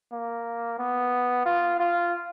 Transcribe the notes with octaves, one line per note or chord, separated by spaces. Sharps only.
A#3
B3
F4
F4